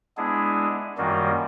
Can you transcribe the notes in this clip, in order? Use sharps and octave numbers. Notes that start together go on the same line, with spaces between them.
G#3 B3 D4 E4 G#4
F#2 D#3 G3 A#3 F4 F#4